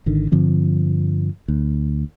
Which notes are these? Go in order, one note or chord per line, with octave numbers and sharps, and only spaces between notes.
G#1 D3 D#3
G2 D3 F3 C4
D2